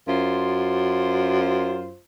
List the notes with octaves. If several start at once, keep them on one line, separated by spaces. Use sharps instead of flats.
F#2 F4 C5